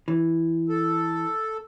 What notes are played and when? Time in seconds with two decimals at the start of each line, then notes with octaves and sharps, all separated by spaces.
0.08 E3
0.69 A4